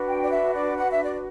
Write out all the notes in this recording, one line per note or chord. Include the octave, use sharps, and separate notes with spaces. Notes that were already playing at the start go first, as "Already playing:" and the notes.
Already playing: D4 F#4 B4
G5
D5
E5
D5
F#5
E5
D5